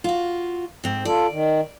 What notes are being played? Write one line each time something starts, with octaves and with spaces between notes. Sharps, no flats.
F4 F#4
G#2 C4
F4 A4 D5
D#3